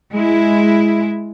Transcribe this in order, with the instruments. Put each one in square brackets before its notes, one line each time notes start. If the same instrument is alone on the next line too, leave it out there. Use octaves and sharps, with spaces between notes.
[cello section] G#3 E4